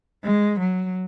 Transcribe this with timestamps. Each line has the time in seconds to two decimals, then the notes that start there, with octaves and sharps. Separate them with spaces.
0.24 G#3
0.59 F#3